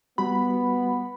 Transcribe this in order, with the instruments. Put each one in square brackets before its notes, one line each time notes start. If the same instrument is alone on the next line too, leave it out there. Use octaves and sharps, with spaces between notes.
[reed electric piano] G3 F#4 [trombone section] B3 [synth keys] B5